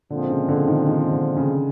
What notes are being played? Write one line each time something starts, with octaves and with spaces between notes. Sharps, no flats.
A#2 D3 F3 G#3 C4
C#3
D3
D#3
D#3
D3
C#3